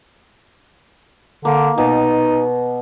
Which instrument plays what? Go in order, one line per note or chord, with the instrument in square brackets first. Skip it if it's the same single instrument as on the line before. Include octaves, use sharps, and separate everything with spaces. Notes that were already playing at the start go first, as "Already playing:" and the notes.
[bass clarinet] D3 [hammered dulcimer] A#3
[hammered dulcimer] B2 [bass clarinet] D#4